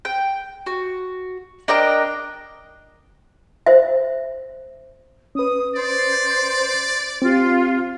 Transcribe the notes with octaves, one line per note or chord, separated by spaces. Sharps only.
G5
F#4
D4 A#4 D#5 G5
C5 E5
C#4 B4 D#6
C5 D5
C4 F4 G4